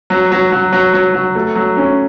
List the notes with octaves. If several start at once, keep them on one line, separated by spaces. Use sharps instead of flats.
F#3
F#3
F#3
F#3
F#3
F#3
A3
F#3
C#4